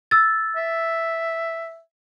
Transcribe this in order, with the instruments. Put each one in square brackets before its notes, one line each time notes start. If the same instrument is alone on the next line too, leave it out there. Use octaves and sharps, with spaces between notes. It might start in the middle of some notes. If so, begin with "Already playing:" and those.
[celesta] E6 A6
[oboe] E5